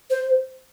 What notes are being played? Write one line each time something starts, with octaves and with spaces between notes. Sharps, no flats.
C5